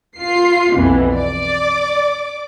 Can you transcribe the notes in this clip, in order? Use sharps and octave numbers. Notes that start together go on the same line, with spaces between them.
F4 C7
B1 F2 B2 E3
D5 D6